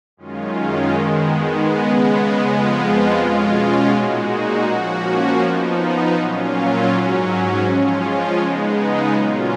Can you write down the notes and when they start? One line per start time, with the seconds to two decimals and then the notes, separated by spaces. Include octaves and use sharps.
0.17 F#2 D#3 G#3 C#4 F4
0.92 D#3 G#3 B3
1.66 C#3 G#3 B3
2.41 F2 F3 G#3 B3 F4
3.16 B2 G#3 C#4 F4
3.90 A#2 G#3 D#4 F#4
4.65 F3 A#3 C#4 F#4
5.39 F3 B3 D#4
6.14 A#2 F#3 C#4 F4
6.89 G#2 F#3 C#4
7.63 F3 G#3 C#4 F4
8.37 C#3 G#3 B3 D#4
9.12 A#2 F#3 C#4 F4